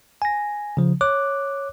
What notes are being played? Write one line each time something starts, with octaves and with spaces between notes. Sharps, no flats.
G#5 A#6
C#3 F3
C#5 D6 F#6